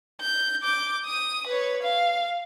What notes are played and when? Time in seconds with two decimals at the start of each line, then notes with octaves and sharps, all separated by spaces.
0.21 G6
0.63 D6 G6
1.05 D#6 D#7
1.47 B4 C#5
1.82 F5